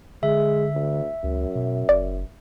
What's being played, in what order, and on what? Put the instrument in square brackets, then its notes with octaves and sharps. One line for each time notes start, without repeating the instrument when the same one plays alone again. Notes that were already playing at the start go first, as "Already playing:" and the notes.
[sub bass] D3 [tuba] G#3 [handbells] E5
[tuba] D2
[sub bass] C#2 [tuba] F#2
[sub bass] B2
[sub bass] F#1 [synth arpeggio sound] D5